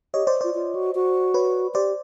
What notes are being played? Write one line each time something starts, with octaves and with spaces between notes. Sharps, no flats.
G4 C#5 D#5
C5 D5
F4 C5 D5
F4
F#4
F#4
B4 C#5
G4 C5 D5